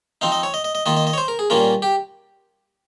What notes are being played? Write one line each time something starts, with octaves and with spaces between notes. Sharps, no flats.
F3 C4 D#4 F5
D#5
C#5
D#5
D#5
D#5
D#3 A#3 F4 D#5
D#5
D#5
C#5
C5
A#4
G#4
A#2 G3 A#3 C#4 F4 A#4
G4